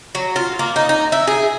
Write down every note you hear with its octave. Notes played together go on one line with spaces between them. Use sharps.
F#3
F4
A#3
D#4
D#4
E4
G#4